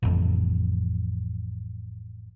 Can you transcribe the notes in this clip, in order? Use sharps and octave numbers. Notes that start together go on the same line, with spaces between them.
A1 F2